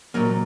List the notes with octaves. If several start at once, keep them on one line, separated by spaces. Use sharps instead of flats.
A#2 F#3 A#3